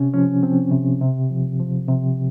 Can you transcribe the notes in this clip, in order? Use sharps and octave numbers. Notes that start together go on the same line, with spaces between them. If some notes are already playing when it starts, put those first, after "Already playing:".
Already playing: C3 C#4
F3 C#4
F3 C4
C3
C3
F3
F3
C3